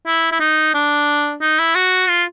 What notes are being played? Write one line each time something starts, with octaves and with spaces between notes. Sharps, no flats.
E4
E4
D#4
D4
D#4
E4
F#4
F4